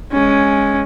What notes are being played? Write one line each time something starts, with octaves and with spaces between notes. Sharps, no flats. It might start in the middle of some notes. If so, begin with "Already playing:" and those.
G#3 C#4